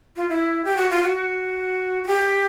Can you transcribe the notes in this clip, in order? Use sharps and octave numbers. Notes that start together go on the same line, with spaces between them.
F4
E4
G4
F#4
F4
F#4
F#4
G4